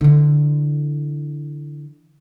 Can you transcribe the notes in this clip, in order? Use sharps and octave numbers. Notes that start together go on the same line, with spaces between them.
D3 E3